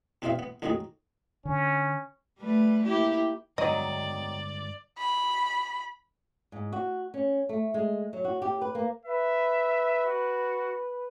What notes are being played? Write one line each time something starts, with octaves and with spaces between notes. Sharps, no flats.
E2 B2 C4 C5 E5 F5
B3
A1 F2 G#2 D#3 F#3 G#4
D3 C#4
G3 A3 B4
A#3 E4 G4
G2 D3 D#3 F#3 G#3 D5 D#5
B5
G#2
F#4
C#4
A3
G#3
F#3
F#4
G4
B4
A#3
B4 E5
F#4